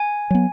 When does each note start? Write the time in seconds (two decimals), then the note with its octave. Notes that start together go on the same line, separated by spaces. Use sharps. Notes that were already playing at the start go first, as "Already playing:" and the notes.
Already playing: G#5
0.30 F#3 B3